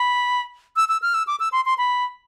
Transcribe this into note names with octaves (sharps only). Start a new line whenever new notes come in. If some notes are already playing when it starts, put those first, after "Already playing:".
Already playing: B5
E6
E6
F6
E6
D6
E6
C6
C6
B5